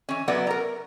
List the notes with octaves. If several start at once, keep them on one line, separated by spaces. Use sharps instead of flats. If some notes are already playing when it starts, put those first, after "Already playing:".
E3 C#4
F#3 B3 E4 D5
A#4 A#5